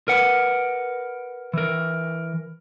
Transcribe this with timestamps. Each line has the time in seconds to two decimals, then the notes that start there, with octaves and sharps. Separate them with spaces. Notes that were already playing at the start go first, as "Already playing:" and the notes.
0.08 A#4 B4 F#5
1.54 E3 A#4